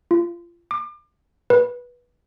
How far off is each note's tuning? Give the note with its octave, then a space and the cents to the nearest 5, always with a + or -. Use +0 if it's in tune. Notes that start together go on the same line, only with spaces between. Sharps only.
F4 -25
D6 +35
B4 -15